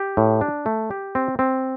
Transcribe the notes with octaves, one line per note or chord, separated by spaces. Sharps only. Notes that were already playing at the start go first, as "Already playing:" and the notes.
Already playing: G4
A2
D4
A3
G4
C4
C4